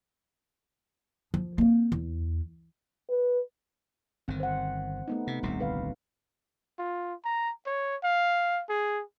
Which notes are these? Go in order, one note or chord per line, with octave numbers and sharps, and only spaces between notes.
F3
A#3 C4
E2
B4
G1 D#3 C4
C5 F#5
A3 B3 D#4
C3
D#1 C2 C3
D3 B4 F5
F4
A#5
C#5
F5
G#4